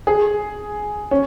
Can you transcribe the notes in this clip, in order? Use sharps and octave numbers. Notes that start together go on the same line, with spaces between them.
G#4
C#4